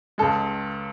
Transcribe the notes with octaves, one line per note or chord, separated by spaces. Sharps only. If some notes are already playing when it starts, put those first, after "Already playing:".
C#2 C#3 G#3 A4